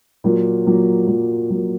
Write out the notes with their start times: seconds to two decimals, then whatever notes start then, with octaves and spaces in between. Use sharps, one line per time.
0.24 A#2 F#3 A#3
0.66 A#2 F#3 A#3
1.07 A#2 F#3 A#3
1.50 A#2 F#3 A#3